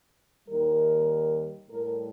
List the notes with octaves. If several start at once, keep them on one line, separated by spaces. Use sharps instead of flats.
D#2 D#3 G3 A#4
A2 G3 A#4